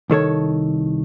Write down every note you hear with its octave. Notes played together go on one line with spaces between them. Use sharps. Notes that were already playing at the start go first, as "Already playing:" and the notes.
C2 D#3 A4 C#5